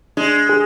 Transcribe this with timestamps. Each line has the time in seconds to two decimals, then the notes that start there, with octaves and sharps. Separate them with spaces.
0.17 G#3 D4
0.49 G#4